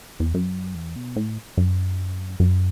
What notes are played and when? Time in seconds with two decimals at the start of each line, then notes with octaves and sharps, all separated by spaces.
0.20 E2
0.34 F#2
0.75 E2
0.96 B2
1.16 A2
1.57 F#2
2.40 F#2